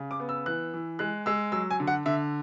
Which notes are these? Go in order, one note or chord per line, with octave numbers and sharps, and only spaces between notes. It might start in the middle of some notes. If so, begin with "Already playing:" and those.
Already playing: C#3
D6
B3
E6
E3 F#6
E3
G#3 F#6
G#3 E6
F#3 E6
G#5
D3
F#5
D3 E5